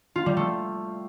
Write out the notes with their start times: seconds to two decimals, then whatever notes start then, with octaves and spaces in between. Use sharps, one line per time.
0.16 F4
0.26 G3
0.37 A3